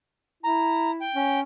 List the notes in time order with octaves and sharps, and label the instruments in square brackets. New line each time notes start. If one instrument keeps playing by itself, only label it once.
[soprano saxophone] E4 [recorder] A#5
[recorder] G5
[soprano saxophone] C#4